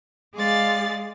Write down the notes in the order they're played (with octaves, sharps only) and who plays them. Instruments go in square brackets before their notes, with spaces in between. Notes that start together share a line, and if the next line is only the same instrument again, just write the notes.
[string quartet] G#3 G#4 D5 F5 A6